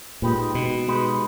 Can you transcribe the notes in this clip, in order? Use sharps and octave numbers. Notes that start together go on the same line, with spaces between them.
A#2 G#3 D#4 G4 B4
B2
G#3 D#4 G4 B4